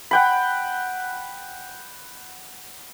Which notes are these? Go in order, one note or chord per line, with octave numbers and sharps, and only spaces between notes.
F#5 G5 B5